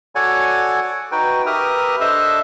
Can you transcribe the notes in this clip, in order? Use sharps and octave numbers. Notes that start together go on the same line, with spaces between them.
F#4 A4 C#5 D5 F#5 G#5
D#4 F#4 B4 G5
G4 A#4 B4 E5 D#6 F6
D4 A4 C5 D#5 E5 E6